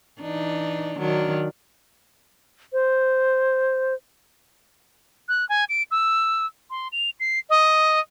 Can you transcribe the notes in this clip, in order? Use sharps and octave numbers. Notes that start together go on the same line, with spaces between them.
E3 D4 D#4
D#3 F#3 D4
C5
F#6
G#5
D7
E6
C6
F7
C7
D#5